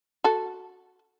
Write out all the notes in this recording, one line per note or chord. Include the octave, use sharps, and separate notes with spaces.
F#4 A4